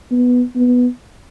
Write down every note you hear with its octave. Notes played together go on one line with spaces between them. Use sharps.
B3
B3